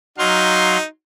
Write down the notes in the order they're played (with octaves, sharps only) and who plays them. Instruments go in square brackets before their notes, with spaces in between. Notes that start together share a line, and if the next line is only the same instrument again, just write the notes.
[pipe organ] F#3 F5 C6 [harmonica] D#4